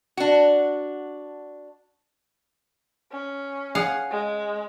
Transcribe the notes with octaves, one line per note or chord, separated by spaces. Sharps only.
D4 F#4
C#4
G#4 F5 F#5
G#3